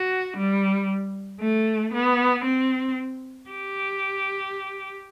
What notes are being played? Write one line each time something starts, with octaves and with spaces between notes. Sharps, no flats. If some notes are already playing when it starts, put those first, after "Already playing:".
Already playing: F#4
G3
A3
B3
C4
G4